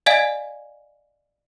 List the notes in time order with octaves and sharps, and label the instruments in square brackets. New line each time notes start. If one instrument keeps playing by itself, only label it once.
[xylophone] D5 D#5 F5 G#5 G#6